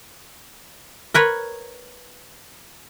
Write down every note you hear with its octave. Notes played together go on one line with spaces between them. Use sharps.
A#4 B4 C#5